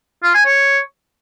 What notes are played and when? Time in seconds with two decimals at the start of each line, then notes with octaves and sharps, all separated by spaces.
0.23 F4
0.35 G#5
0.46 C#5